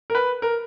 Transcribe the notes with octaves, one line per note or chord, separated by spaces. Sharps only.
A#4
B4
A#4